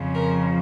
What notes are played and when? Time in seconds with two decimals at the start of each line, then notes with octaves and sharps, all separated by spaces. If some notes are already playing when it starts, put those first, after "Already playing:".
Already playing: F2 C#3 F3
0.15 A#4